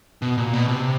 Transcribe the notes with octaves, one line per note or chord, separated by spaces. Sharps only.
B2
A#2
B2
C3